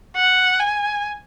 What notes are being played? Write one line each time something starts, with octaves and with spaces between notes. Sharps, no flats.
F#5
G#5